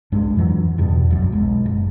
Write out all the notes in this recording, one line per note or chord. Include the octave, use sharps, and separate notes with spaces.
B1 G2 G#3 D4
F2 E3 F#3
E2 G2 B2
F1 B1 F#2
B1 G#3
F#1